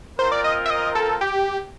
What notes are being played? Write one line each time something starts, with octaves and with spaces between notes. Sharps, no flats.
C4 F4 A#4 C5
D5
D#5
E5
D#5
A4
G4